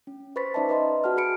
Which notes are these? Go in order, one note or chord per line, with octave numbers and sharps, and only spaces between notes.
C#4
B4 C5 B5 C#6 A6 B6
C#4 D#4 D5 E5 A5
B4 D#5 A#5 C6
F#4 G#4 F#5 A5 F6
G#4 B5 C#7 D7